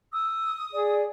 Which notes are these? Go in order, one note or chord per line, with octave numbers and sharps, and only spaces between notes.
D#6 E6
G#4 D5